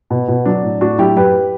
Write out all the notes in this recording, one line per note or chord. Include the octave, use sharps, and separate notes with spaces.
B2
B2
F#3 D4
A2
A2 D4 F#4
F#3 E4 G4
F#2 G4 B4